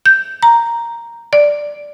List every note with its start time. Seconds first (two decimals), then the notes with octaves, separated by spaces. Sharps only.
0.06 G6
0.43 A#5
1.33 D5